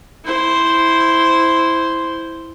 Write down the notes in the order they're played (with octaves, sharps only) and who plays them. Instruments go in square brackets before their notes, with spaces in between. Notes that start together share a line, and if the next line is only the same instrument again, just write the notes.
[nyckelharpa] E4 C5